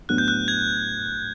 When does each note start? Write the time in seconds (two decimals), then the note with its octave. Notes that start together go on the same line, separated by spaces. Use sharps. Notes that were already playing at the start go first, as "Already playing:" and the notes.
0.09 A2 F#3 B3 D4 F#6
0.18 G6
0.28 F#6
0.48 G#6